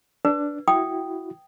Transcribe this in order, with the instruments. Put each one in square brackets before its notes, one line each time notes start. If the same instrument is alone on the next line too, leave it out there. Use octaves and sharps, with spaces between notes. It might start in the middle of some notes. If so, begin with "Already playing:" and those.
[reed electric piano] D4 [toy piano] B4
[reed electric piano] E4 F#4 [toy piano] G5 D#6